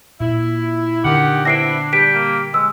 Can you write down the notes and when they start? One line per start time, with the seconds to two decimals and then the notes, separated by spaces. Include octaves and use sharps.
0.20 A#2 E4
1.05 D3 D#3 G4 F#5
1.45 B3 C4 D4 E4 A#6 C7 D7
1.93 G3 G4 B6 D7
2.14 A#3
2.54 G#3 E6